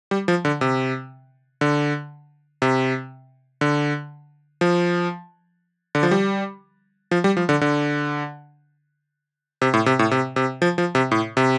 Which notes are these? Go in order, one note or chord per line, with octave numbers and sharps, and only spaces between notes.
G3
F3
D3
C3
D3
C3
D3
F3
D3
F3
G3
F3
G3
F3
D3
D3
C3
A2
C3
A2
C3
C3
F3
F3
C3
A2
C3